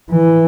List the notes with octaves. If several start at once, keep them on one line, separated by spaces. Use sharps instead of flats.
E3